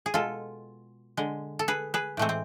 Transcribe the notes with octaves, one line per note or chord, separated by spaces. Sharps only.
G#4
B2 G#3 F4 A4
D3 G#3
A4
G#4 B4
G#4 B4
A2 E3 G#3 A3 C4
C4